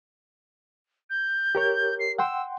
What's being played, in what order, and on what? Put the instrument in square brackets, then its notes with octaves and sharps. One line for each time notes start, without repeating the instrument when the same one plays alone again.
[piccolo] G6
[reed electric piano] G4 A#4 C#5
[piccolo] C7
[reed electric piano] F#5 G5 C6 [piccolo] E6